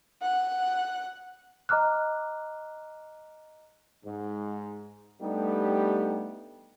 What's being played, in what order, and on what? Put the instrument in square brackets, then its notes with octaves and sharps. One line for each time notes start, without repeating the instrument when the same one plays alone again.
[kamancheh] F#5
[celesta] D#5 A#5 D6 F6 F#6
[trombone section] G#2
G3 A3 B3 D4 D#4 G4